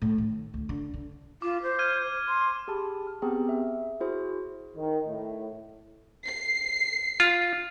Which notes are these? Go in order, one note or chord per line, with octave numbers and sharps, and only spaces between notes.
A2
D#3
D2
D3
D3
F4 D6
C5
F6 G#6 D#7
C6
G4 G#4 A5 B5
F6
B3 C4 G4 G#4 G5 A#5
E5
E4 F#4 G#4 C5
D#3
A2
C7
F4